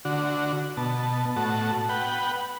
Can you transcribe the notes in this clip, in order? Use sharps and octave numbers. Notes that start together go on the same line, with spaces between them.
D3 F#4
B2 A5
A2 F#4 A5
B4 F#5 G5